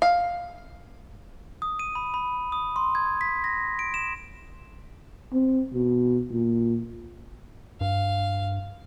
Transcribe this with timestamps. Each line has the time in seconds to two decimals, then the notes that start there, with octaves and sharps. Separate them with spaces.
0.02 F5
1.62 D#6
1.79 D#7
1.95 B5
2.14 B5
2.52 D#6
2.76 C6
2.95 G#6
3.21 B6
3.44 A#6
3.79 D7
3.94 E7
5.33 C4
5.73 B2
6.31 A#2
7.81 G2 F5